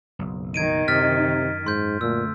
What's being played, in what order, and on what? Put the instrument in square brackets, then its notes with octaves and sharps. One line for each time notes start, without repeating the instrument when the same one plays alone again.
[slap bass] F#1 B1
[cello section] D#3 D#4 [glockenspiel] G#6 D7 D#7
[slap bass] F#2 [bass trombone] C3 [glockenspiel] F6 A6 B6
[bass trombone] G#2 [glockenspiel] C6 G6
[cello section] D2 [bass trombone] A#2 [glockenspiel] E6